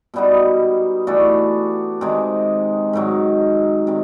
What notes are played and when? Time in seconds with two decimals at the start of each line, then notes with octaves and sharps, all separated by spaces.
0.14 B2 G3 B3 D#4
1.07 E3 A3 D4 F#4
2.01 C3 D#3 G#3
2.93 G#2 D#3 F#3
3.87 C3 D#3